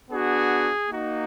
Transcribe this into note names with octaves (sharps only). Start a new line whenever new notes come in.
B3 D4 F#4 G#4
A#3 D#4 F#4